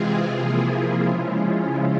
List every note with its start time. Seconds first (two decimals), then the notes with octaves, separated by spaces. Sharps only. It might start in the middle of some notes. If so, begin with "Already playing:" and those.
Already playing: C3 E3 G#3 C4 F4 G#4
0.31 C3 F3 A#3 E4
1.00 C#3 F3 G#3 C#4 E4 F4